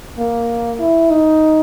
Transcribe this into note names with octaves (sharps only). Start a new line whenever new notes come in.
A#3
E4
D#4